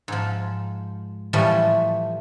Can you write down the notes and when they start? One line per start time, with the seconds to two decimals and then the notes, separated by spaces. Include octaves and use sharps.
0.08 G#2 F3
1.33 A2 E3 F3 G3 A3